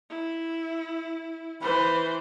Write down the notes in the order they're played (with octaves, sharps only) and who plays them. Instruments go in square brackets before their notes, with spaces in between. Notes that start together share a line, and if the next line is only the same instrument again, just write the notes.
[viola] E4
[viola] E3 C5 [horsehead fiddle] B4